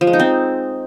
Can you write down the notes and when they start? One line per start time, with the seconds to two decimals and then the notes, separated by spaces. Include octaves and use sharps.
0.01 F3
0.07 G#3
0.13 D#4
0.19 C4